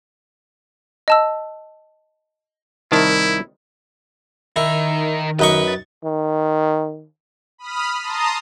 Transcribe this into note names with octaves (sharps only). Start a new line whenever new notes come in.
D#5 A5 E6
C2 D#3 E4 A5
D#3 D#4 E4 A#4
F#2 D#4 B4 C#6
A6
D#3
B5 D#6 F6
A5 A#5 C6 D#6